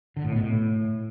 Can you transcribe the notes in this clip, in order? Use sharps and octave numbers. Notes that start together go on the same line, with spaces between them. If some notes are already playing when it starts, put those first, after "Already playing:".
D3
A2
B2
A2